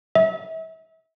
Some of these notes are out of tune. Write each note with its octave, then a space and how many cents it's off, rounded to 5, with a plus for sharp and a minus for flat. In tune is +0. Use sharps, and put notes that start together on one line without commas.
E5 -35